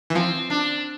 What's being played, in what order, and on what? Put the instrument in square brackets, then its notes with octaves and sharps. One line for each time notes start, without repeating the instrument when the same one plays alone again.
[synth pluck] E3
[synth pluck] F3 [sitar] C4
[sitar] D4